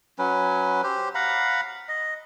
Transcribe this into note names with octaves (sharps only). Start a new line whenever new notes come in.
F#3 C#4 B4
G4 C5
F5 F#5 A#5 B5
D#5